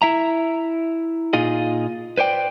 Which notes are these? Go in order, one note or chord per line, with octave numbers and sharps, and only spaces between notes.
E4 E5 A#5
A#2 D#4 F4 G#4 D#5
B4 C5 D5 G5